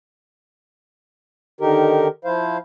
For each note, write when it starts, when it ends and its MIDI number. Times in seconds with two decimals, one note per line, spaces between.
1.61 2.08 50
1.61 2.08 51
1.61 2.08 63
1.61 2.08 67
1.61 2.08 70
2.25 2.57 53
2.25 2.57 64
2.25 2.57 72
2.25 2.57 77